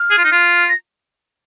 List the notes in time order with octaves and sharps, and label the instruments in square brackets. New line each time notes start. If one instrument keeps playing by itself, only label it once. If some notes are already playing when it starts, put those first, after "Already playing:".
Already playing: [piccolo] F6
[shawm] G#4
F4
D#4
F4
[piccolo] A#6